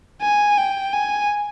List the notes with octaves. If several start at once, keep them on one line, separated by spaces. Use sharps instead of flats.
G#5
G5
G#5